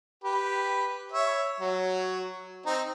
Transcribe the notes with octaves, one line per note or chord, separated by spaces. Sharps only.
G4 B4
C#5 E5
F#3 C#5
C4 D#4